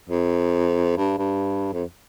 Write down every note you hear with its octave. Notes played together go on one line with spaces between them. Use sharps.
F2
G2
G2
F2